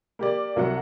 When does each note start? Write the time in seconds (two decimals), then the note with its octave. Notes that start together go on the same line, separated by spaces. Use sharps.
0.19 A#3 G4 D5
0.56 C2 F#3 F#5